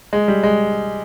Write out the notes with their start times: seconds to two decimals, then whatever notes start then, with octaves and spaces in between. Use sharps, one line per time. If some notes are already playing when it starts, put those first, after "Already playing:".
0.13 G#3
0.28 G3
0.43 G#3